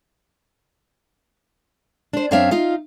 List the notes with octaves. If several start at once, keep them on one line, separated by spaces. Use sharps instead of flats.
D4 C5
F#2 C4 D4 C#5 E5 F5
D#4 F4 F5